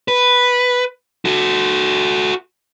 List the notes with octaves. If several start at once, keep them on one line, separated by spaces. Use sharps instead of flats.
B4
F#4 A4